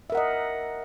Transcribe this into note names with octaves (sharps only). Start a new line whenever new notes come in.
A#4 D#5 E5 F#5